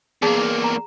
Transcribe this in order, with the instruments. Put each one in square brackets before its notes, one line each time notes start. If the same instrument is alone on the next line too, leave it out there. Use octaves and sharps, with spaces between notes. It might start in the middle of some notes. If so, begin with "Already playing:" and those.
[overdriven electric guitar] E2 A#3 [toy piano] G#4 A5
[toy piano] A#5